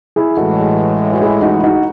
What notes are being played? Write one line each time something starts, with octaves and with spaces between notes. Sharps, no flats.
E4 G#4
A1 A2 E3 G#3 F#4 A4
F#4
E4 G#4
D#4 F#4
E4
D#4 F#4